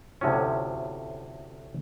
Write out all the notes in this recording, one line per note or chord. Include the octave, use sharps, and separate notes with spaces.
D2 A2 C3 F3 C#4